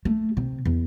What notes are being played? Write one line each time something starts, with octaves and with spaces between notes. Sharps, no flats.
A3
C3
E2